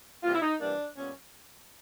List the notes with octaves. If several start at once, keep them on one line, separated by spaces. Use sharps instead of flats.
C3 E3 G3 A#3 F4
E4
D#4
C3 E3 G3 A#3 D4
A#2 G3 B3 C#4